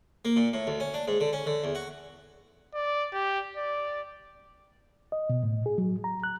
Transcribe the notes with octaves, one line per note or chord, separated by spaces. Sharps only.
A#3
A#2
A2
D2
C#4
D4
G#2
D3
C#4
D3
E2
F#4
D5
G4
D5
D#5
B2
A2
G#4
F#3
A#5
F#6